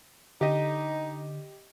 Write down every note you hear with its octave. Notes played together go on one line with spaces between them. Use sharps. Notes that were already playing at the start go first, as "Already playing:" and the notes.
D3 D#4 G4 D#5